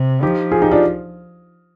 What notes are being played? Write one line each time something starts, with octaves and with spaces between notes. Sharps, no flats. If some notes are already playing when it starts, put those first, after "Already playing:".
Already playing: C3
F3 D#4 G4
F4 G#4
D#4 G4
D4 F4